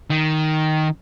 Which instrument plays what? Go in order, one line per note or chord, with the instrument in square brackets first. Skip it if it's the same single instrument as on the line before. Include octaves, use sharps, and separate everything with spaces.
[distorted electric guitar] D#3